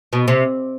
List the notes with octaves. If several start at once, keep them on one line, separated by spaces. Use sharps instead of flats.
B2
C3